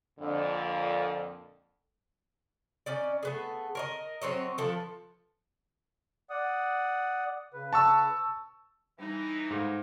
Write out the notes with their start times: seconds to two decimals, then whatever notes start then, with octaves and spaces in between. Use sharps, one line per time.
0.19 F2 A#2 D3
2.86 C#4 D#4 D5
3.23 A3 B3 G#4
3.75 A#4 C#5 D#5
4.22 F#3 C4 C#5 D#5
4.58 F3 A4 B4
6.30 D5 F#5 D#6
7.54 C#3 B4
7.73 A5 C#6 E6
8.99 E3 G3 D#4
9.50 G#2 G#4 A4 F5